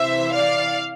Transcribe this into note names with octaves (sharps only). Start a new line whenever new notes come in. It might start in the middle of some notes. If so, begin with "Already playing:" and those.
Already playing: C3 E3 C5 E5
D5 F5